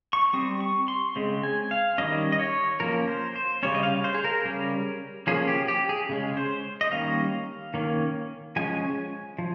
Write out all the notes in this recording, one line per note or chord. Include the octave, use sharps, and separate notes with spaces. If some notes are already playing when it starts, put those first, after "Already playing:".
C#6
G3 C4 D#6
C#6
C6
C#3 G#3 C4
G#5
F5
D#3 G3 C#4 D#5
D#5
C#5
F3 A#3 C#4 A#4
C5
C5
C#3 G3 C#4 C#5
D#5
F5
C5
G#4
A#4
C#3 G3 C#4
F3 A#3 C#4 G#4
G4
G4
G#4
C#3 G#3 C#4
C5
D#5
D#3 G3 A#3 C#4 F5
D#3 A#3 C#4
F3 G#3 C#4 G#5
F3